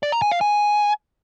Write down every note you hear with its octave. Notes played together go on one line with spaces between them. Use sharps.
D5
A#5
G#5
F5
G#5